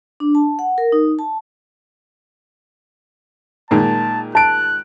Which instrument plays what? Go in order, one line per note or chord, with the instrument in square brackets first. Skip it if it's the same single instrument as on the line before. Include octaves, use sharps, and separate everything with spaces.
[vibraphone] D4
A5
F#5
A#4
D#4
A5
[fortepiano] A#2 D#3 G#3 [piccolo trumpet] A5
[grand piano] A5 D7 [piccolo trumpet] F#6